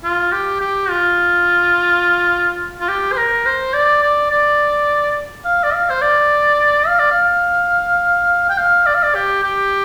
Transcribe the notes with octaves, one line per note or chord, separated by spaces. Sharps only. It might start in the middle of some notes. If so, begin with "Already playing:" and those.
F4
G4
G4
F4
F4
G4
C5
A#4
C5
D5
D5
D5
F5
D5
F5
C5
D5
F5
D5
F5
G5
F5
D5
F5
D5
G4
G4